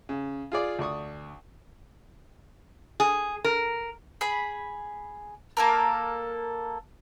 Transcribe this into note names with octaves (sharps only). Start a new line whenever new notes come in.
C#3
F4 G#4 D5
D2 D5 C#6 D#6
G#4
A#4
G#4 B5
A#3 A4 A#4